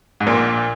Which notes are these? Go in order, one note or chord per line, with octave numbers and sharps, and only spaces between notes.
G#2
A#1 A#2